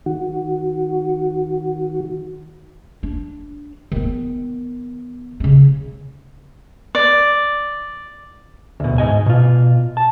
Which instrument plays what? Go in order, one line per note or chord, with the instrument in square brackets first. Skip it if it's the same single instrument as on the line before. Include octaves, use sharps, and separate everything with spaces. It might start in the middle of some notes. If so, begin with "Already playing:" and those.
[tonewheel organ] D#3 F#4
[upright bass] D4
D#3 B3
C#3 C#4
[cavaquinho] D5
[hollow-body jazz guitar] D2 B2
G#2 D#5 G#5
B2 F4
A5